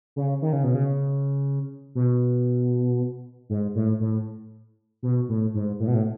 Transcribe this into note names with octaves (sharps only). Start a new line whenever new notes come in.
C#3
D#3
C#3
B2
C#3
B2
G#2
A2
A2
B2
A2
G#2
A2
B2
A2